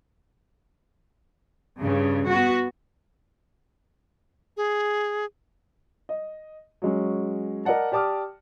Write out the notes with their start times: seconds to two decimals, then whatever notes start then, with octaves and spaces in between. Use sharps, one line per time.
1.80 G2 C#3
2.27 B3 F#4
4.57 G#4
6.09 D#5
6.82 F#3 G#3 C#4
7.65 A#4 D5 D#5 F#5 A5
7.92 G4 D5 A5 D6 D#6 F6